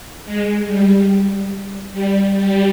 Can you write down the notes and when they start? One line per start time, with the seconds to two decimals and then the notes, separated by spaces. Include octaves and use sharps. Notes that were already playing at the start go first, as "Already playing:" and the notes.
0.25 G#3
0.66 G3
1.93 G3
2.36 G3